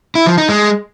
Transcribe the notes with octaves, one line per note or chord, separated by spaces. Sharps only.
E4
F3
D#4
G#3